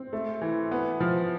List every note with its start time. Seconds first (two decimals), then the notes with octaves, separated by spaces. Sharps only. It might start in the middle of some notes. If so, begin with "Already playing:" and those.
Already playing: C4
0.13 A3
0.41 E3
0.71 B3
1.00 F3